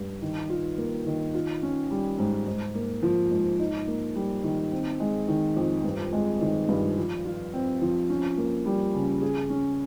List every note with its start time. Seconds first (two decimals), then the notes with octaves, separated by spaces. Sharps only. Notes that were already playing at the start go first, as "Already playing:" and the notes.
Already playing: G2
0.22 D#3
0.50 F4
0.78 A#3
1.06 D#3
1.34 F4
1.63 C#4
1.91 G3
2.19 G#2
2.47 G#2
2.75 A#3
3.03 F3
3.31 G#2
3.60 D#4
3.87 A#3
4.16 G3
4.43 D#3
4.72 C4
5.00 G#3
5.28 D#3
5.56 F2
5.84 G2
6.13 G#3
6.41 D#3
6.69 G2
6.97 F3
7.25 F4
7.53 C4
7.82 F3
8.10 C#4
8.37 A#3
8.66 G3
8.94 C#3
9.22 G#4
9.50 C#4